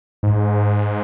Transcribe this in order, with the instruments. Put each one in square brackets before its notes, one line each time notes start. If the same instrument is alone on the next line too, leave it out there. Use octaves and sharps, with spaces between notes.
[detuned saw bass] G#2